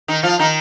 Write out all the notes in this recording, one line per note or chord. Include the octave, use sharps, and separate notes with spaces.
D#3 D#4
F3 F4
D#3 D#4